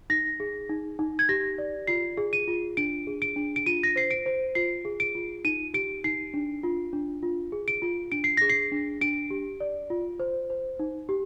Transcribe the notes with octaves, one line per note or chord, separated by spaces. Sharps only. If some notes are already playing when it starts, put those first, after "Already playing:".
D#4 A#6
G#4
D#4
D#4
G#6
G4 A#6
D5
F4 C7
G#4
D#7
F4
D4 D7
G#4
D7
D4
D7
F4 D#7
A#6
C5 C7
D7
C5
F4 C7
G#4
D7
F4
D#4 D#7
G4 D7
D#4 C7
D4
F4
D4
F4
G#4
D7
F4
D4 D7
C7
G#4 A#6
C7
D4
D4 D7
G4
D5
F4
C5
C5
D#4
G4